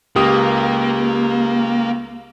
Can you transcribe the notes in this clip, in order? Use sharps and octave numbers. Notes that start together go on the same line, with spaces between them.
C#2 A#3 G4 D#6